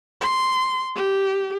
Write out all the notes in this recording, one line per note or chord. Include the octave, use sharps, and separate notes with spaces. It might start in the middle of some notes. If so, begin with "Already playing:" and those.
C6
G4